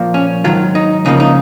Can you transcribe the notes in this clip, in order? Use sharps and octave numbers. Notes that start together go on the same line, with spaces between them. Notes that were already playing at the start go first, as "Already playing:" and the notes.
Already playing: A#2 F3 A#3
C#4
G#2 D#3 F#3 F4
D#4
C#2 C#3 F3 A#3 D#4
D#4